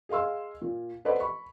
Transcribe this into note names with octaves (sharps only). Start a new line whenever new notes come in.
G#4 D#5 F5 C6 E6
A#2
A4 B4 C5 D5 D#5 F#5
B5 C#6